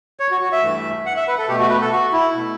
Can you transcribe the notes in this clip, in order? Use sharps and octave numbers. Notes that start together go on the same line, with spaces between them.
C#5
F#4
F#4
E5
G2 E3 A3
F#5
E5
B4
A4
B2 A3 G4
F#4
B4
A4
F#4
E4
B2 A3